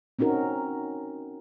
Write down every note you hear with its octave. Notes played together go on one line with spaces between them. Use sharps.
C4 C#4 D#4 F#4 A#4